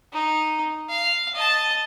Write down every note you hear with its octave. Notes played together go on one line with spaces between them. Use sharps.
D#4
F5
D#5 A5